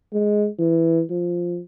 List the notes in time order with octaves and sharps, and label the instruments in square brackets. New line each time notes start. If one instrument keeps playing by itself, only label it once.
[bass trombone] G#3
E3
F3